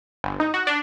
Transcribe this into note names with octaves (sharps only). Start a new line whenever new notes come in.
G1
D#4
F#4
D4